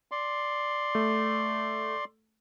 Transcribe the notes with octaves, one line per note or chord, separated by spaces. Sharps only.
D5 C6
A3